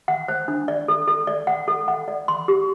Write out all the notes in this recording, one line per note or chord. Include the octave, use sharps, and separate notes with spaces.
F#5
C5
D4
D5
A4
A4
D5
F#5
A4
F#5
D5
C6
G4